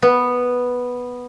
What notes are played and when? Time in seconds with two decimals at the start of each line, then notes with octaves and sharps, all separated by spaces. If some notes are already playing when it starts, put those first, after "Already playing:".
0.02 B3